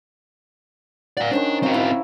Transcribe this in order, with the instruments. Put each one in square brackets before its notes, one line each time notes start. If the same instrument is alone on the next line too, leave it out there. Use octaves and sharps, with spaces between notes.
[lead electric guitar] D5 F5 [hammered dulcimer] F#5 A#5
[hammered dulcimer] D#3 C#4 C5 [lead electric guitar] D4
[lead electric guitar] C4 F#4 [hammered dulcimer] F5 A#5 C#6
[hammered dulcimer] E4